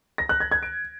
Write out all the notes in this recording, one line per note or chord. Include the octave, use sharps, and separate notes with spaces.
A#6
F#6
G#6
G#6
D7